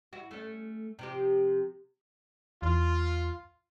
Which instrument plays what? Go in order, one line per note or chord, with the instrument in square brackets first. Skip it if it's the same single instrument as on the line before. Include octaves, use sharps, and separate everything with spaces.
[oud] E4 F#4
A3 C#4
C3 F3 G4
[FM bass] E2 [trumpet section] F4